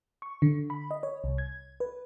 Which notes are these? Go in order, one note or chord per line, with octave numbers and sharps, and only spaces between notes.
C#6
D3
B5
D#5
C#5
C2
G#6
B4